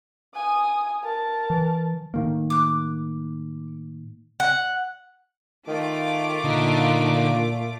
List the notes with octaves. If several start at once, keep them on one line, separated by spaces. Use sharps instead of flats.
G#5 D#6
A#4 A5
E3
A2 D#3 A#3
D6 F#6
F#5
D#3 A3 F4 D6
A#2 D3 D#4